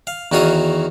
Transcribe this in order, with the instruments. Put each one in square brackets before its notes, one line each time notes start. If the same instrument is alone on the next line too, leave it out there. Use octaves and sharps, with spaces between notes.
[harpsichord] F5
E2 D#3 F#4 C#5 F5 D#6